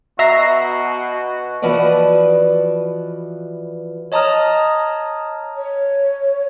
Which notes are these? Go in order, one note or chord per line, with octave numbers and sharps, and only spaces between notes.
B2 F#4 E5 A#5 C7
E3 F3 F#4 B4 D5 D#5
C#5 D#5 A5 A#5 D#6 F6
C#5